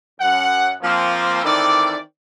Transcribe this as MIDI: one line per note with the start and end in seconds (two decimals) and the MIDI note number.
0.21 0.70 42
0.21 0.70 78
0.82 1.41 53
0.82 1.41 58
0.82 1.41 60
1.43 1.96 51
1.43 1.96 52
1.43 1.96 60
1.43 1.96 69
1.43 1.96 74